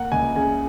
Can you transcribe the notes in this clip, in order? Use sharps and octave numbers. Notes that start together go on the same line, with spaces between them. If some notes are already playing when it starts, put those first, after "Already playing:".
Already playing: A#3 F#5
C#2 G#5
C#3 G#5